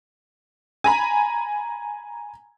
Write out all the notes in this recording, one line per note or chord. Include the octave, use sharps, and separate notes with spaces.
G#5 A#5 B5